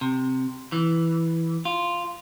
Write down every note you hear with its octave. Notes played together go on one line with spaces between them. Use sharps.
C3
E3
F4